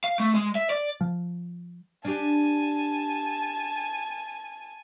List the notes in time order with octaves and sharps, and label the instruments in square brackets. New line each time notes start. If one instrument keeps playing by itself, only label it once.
[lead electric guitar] F5
A3
G#3
E5
D5
[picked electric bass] F3
[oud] D4 G4 [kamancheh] G#5 A5